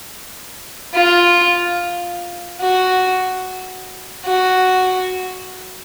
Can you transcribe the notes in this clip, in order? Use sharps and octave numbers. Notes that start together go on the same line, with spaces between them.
F4
F#4
F#4